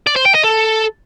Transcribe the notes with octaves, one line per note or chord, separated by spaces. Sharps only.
D5
C5
G5
D#5
A4